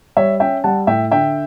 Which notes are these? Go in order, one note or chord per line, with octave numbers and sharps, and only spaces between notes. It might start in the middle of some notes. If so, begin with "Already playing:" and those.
G3 C#5 E5
C#4 E5 G5
G3 F#5 A5
A2 E5 G5
D3 E5 G5